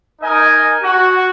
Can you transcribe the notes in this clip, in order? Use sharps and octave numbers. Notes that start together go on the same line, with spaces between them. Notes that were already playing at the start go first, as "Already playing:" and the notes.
D#4 A#4 D#5 G#5
F#4